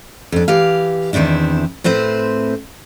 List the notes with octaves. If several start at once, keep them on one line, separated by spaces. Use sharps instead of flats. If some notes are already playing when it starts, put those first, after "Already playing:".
F2 D4
E3 G4 F5
E2 D#3 C4 D4 E4
A2 C4 B4 C5 E5